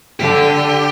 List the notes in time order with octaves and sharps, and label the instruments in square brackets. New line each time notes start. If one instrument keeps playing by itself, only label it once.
[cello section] D3 [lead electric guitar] G4